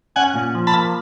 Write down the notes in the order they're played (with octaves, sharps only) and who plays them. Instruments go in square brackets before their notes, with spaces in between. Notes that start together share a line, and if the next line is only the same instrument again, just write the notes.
[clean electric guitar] C#4 [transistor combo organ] F#5 G#5
[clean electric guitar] A#2
F3
[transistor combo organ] A5 B5
[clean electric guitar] A#3